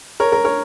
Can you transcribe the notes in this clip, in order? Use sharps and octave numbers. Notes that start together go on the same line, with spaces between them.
A#4 C#5
A#4
A#4 C#5